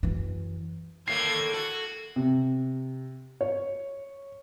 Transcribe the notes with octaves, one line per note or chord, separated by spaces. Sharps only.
F#2 E3
D#2 A2 D3 A3 A#3 G#6 C7
F#4 A4
C3
C#5